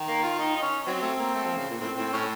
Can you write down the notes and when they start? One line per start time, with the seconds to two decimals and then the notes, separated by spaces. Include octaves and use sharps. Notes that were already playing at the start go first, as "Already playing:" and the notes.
Already playing: D#3
0.08 A#3
0.23 F4
0.39 D#4
0.56 D#4
0.63 C#4
0.87 F#3 C4
1.02 A3
1.19 A#3
1.34 A3
1.46 F3
1.57 C#3
1.70 A#2
1.81 A2 C4
1.97 A2 C4
2.13 A2 C#4